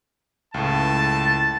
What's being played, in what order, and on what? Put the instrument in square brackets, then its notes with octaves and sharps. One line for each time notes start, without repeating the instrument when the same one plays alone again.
[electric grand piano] C#2 A2 [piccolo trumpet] A5
[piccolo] A6